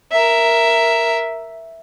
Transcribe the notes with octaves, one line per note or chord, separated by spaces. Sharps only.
A#4 E5